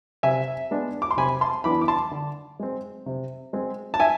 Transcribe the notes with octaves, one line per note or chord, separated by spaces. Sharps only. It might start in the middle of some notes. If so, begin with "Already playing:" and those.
C3 E5 G#5
G#3 B3 D4
D6
C6
C3 G#5 B5
A5 C6
E3 B3 D4 B5 D6
D6
A5 C6
D3
G#3 C4
C3
G#3 C4
A5
E5 G#5